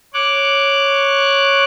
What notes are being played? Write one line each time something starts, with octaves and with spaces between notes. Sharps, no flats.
C#5 D6 F#6